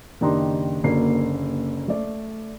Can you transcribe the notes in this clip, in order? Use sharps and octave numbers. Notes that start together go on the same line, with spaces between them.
F#1 D#3 D4 D#4 G4 C6
F#1 D3 A#3 F#4 C7
A3 D5